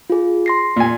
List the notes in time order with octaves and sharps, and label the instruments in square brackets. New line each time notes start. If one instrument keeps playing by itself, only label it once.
[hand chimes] F4 G#4
C6 A#6 C7
[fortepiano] A#2 G#5